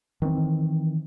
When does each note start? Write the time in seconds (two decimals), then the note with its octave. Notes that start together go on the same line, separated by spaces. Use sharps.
0.22 D#3 E3 B3 C4